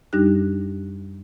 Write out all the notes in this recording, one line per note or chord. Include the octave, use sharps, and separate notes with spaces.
F#2 G3 D4 D#4 G4 F#6